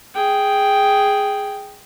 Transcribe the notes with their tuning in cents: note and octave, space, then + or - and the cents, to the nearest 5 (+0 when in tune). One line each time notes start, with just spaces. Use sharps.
G#4 +0 G5 +0